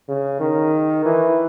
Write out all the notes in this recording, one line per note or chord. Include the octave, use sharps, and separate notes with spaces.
C#3
D#3
E3